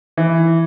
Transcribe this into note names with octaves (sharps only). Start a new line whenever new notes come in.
E3